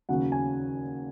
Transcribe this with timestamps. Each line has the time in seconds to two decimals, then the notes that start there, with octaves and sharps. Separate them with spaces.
0.09 D#2 C#3 F#3 F#5
0.32 G#5